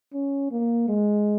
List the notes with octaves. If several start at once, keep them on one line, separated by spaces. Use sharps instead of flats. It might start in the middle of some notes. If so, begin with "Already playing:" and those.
C#4
A#3
G#3